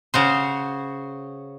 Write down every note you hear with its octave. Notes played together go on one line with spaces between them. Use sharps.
C#3 F#4 C5